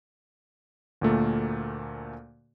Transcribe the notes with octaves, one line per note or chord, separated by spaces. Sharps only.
D2 A#2 A3 A#3